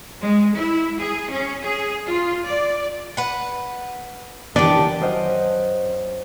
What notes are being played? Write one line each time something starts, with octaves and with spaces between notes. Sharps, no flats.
G#3
E4
G#4
C#4
G#4
F4
D5
B4 F#5
D#3 E3 B3 D4 G4 D5
F#2 C5 D#5 F#5 F6 G6